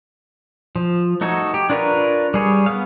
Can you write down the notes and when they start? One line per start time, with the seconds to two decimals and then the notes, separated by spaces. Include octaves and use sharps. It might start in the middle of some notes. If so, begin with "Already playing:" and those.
0.76 F3
1.21 A3 D#4 F#4 A4 C#5
1.54 G4
1.70 D4 F4 A#4 B4 C#5
2.34 G3 G#4 C#5
2.66 B3 F5